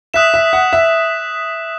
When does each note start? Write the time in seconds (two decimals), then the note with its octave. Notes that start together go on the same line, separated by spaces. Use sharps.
0.14 E5 D#6 F#6 B6 E7
0.34 E5
0.53 F#5
0.73 E5